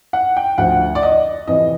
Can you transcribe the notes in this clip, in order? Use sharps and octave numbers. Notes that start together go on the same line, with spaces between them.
F#5
G5
D2 D3 F3 F#5
D5
D#5
F2 C3 E3 D#5